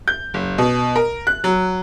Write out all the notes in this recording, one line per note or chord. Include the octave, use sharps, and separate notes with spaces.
G6
F#1
B2
A#4
F#6
F#3